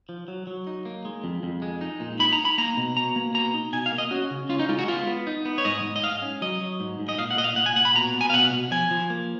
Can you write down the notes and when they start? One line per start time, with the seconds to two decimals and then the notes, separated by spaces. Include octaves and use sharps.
0.09 F3
0.28 F#3
0.47 F#3
0.67 D#4
0.85 A#3
1.05 G#3
1.24 F2
1.43 F2
1.62 G#3
1.81 D#4
2.00 A#2
2.19 D#4 B5
2.32 A#5
2.39 D#4
2.45 B5
2.58 A#3 A#5
2.77 B2
2.96 B2 A#5
3.16 A#3
3.34 B2 A#5
3.54 D#4
3.73 B2 G#5
3.86 F5
3.92 A#3
3.98 D#5
4.11 C#4 F#4
4.31 C#3
4.49 C#4 F4
4.59 D#4
4.69 G#3 F4
4.79 F#4
4.88 B3 F4
5.07 B3
5.27 D#4
5.45 B3
5.58 C#5
5.65 G#2 D#5
5.84 G#2
5.96 D#5
6.03 G#2 F5
6.22 C#4
6.42 F#3 D#5
6.61 F#3
6.80 G#2
7.00 G#2
7.09 D#5
7.19 A#2 F5
7.31 F#5
7.37 A#2 D#5
7.44 F5
7.56 A#2 F#5
7.66 G#5
7.76 A#2 F#5
7.85 B5
7.95 B2 A#5
8.14 B3
8.21 G#5
8.30 F5
8.33 B2 F#5
8.53 B2
8.71 F3 G#5
8.91 F3
9.10 A#3